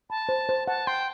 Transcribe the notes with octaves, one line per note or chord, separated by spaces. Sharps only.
A5 B5
C5
C5
F#5 A5
G5 C6